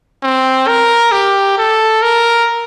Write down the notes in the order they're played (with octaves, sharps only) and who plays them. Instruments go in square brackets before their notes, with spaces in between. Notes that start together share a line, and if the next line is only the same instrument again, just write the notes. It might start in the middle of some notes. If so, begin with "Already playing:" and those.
[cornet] C4
A#4
G4
A4
A#4